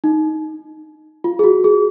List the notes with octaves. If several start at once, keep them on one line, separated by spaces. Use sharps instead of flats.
D#4
F4
G#4
F#4
G#4